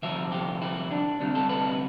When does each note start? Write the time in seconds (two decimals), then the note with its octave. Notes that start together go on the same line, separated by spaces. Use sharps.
0.02 D2 C3 F3 E5
0.32 G4
0.62 E4
0.91 D4
1.20 D2 C3 G3
1.35 A4
1.49 B4